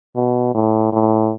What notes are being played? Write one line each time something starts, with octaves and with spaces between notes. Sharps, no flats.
B2
A2
A2